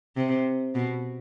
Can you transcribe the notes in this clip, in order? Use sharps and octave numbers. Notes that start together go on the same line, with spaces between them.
C3
B2